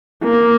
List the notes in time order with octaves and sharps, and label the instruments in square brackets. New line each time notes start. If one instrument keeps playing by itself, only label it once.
[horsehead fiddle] A#3